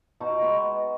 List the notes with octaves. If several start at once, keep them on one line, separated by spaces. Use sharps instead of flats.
B2 D#4 F#4
G#3 B3